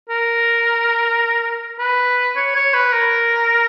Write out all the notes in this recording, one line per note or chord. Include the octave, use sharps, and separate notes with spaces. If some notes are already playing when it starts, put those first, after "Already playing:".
A#4
B4
C#5
C#5
B4
A#4